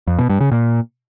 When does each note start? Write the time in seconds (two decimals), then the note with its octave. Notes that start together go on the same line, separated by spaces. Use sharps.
0.07 F2
0.18 B2
0.30 G2
0.41 C#3
0.52 A#2